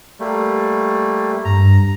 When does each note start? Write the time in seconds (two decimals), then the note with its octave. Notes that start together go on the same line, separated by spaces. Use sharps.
0.20 G3 A3 A#3
1.45 G2 A#5